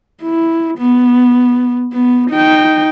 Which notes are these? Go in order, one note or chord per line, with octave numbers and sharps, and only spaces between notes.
E4
B3
B3
D#4 G5